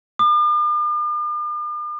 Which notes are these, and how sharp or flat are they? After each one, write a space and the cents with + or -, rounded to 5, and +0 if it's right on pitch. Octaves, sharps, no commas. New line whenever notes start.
D6 +45